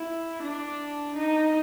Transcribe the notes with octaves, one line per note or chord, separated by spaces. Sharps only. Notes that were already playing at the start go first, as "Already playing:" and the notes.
Already playing: E4
D4
D#4